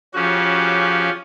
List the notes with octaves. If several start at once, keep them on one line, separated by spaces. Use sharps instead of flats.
C#3 F3 C#4 F#4 G4